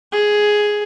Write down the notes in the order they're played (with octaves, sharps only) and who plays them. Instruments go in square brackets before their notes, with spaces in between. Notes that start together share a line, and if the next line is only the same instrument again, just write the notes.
[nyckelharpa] G#4